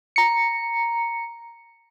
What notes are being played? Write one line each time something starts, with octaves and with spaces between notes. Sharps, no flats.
A#5 C#7